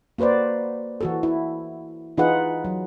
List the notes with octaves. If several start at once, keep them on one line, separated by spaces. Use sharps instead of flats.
A#3 F#4 B4 C5 D5
E3 F#4 A4
E4
E3 D#4 F4 G#4 B4 F#5
F#3